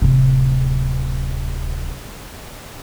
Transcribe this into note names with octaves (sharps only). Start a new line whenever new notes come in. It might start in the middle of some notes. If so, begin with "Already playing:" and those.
D1 C3